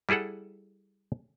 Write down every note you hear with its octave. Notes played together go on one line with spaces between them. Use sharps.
G3 E4 G#4 A4 F#5